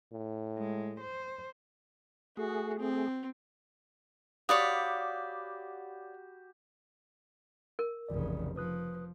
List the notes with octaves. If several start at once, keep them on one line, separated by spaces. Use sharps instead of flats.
A2
G#3
C5
A3 F#4 G#4
C4
F#4 G4 C#5 D5 F5 B5 D#6
A#4
F1 A#1 C#3 E3 D5
F3 B4 D#6 F#6